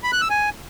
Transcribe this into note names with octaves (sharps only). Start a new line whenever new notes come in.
B5
F#6
E6
G#5